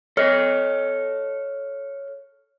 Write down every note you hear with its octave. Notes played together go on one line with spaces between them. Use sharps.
A4 C#5 D#5 F6